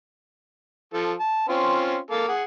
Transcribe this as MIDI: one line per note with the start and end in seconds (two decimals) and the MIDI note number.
0.94 1.13 53
0.94 1.13 69
1.20 1.46 81
1.49 1.97 60
1.49 1.97 61
1.49 1.97 65
2.11 2.27 58
2.11 2.27 69
2.11 2.27 77
2.28 2.44 68
2.28 2.44 78